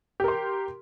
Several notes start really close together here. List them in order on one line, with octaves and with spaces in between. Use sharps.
G4 A#4 C6